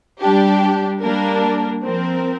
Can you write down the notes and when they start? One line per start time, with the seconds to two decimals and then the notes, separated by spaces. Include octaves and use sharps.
0.20 G3 D4 G4
1.01 G3 A#3 D4 A#4
1.83 F3 C4 A#4